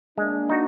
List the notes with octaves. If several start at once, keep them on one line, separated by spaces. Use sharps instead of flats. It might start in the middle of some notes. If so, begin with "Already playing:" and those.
G#3 A#3 D4
D#4 F#4